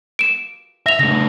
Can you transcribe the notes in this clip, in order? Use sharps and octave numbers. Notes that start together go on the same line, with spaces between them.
D7 E7
E5 A#6 F7
C#3 A3 A#6